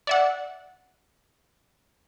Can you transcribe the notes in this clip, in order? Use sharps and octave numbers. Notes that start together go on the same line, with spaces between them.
D5 E5 F#5